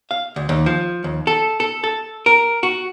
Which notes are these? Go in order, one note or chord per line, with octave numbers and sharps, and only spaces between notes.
F5
D2
D#2
F3
D#2
A4
A4
A4
A#4
F#4